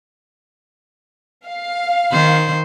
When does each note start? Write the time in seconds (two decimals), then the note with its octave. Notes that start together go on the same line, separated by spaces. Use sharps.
1.48 F5
2.12 D#3 C5